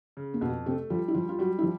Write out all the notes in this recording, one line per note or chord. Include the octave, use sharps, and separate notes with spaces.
C#3
A#3
F2 B2 B3
C3 A3 C4
F3 G3 F4
E4
F3 G3 F4
F4
F#3 G3 F#4
E4
F3